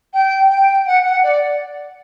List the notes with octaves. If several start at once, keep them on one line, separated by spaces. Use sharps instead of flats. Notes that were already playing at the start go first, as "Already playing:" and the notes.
G5
G5
F#5
F#5
D5